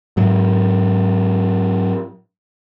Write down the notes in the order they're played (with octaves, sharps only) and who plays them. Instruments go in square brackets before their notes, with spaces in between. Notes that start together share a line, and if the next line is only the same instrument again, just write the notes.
[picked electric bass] G#2 F#3